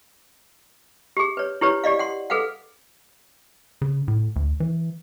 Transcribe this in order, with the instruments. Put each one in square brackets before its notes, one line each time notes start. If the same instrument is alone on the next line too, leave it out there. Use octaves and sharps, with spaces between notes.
[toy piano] G4 G#4
B4 C#5
E4 G4 B4 C#5
G4 D5 D#5 F5
F#5 C6
G#4 A4 B4 F5 F#5
[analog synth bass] C#3
A2
D2
E3